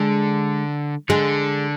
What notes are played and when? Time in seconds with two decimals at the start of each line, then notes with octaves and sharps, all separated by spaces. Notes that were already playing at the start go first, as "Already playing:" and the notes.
Already playing: D3 G#3
1.09 D3 G#3